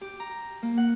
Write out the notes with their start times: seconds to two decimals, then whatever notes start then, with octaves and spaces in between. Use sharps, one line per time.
0.01 G4
0.20 A#5
0.62 A#3
0.78 F#5